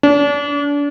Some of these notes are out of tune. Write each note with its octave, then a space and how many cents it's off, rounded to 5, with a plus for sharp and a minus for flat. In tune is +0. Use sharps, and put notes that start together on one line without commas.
D4 -35